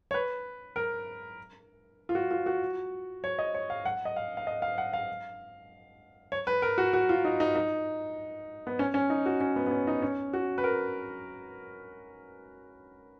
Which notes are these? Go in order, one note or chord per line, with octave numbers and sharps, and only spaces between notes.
C#5
B4
A#4
F4
F#4
F4
F#4
C#5
D#5
C#5
F5
F#5
D#5
F5
F5
D#5
F5
F#5
F5
C#5
B4
A#4
F#4
F#4
F4
D#4
D#4
D#4
B3
C#4
C#4
D#4
F#4
C#4
B3
B3
C#4
D#4
C#4
F#4
B4
A#4